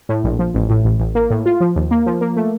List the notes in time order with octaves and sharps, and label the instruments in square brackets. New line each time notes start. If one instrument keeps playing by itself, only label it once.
[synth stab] A2
A#1
F3
A1
A2
A1
A1
A#3
A2
F4
F3
D#2
A#3
F3
A#3
A3